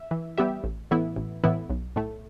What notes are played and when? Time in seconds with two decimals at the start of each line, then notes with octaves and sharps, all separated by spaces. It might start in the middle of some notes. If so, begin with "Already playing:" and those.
Already playing: E5
0.11 E3
0.38 G3 B3 G4 E5
0.64 A1
0.91 A2 E3 B3 E4
1.16 A1
1.44 A2 E3 B3 E4
1.70 B1
1.96 A2 A3